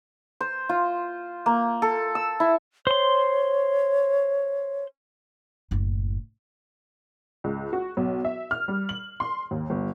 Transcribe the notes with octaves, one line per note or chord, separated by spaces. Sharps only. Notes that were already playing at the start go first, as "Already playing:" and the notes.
C5
F4
A#3
A4
E6
E4
C5 C#5 C6
F#1 A2
C#2
F#4
B1
E5
F6
G3
F#7
C6
D#2
G1